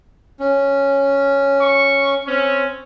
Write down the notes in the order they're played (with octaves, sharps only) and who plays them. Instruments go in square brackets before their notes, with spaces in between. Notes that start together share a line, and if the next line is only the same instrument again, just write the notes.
[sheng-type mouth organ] C#4
[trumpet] C#6
[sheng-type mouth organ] C4 [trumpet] C#4